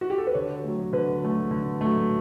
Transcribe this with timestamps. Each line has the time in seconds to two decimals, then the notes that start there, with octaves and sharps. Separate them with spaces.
0.01 F#4
0.10 G4
0.18 A4
0.27 B4
0.34 D3 C#5
0.64 F#3 A3
0.93 D3 B4
1.22 F#3 A3
1.51 D3
1.81 F#3 A3